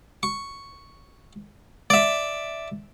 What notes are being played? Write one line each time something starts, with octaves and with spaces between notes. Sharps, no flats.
C#6
D5 E5